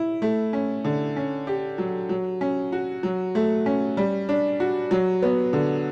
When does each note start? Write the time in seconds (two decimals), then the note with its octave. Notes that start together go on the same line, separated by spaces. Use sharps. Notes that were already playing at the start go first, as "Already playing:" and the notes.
Already playing: E4
0.22 A3
0.53 C#4
0.85 D3
1.16 C#4
1.47 G4
1.78 F#3
2.09 F#3
2.41 C#4
2.72 F#4
3.03 F#3
3.35 A3
3.66 C#4
3.97 G3
4.29 D4
4.60 F#4
4.91 F#3
5.22 B3
5.53 D3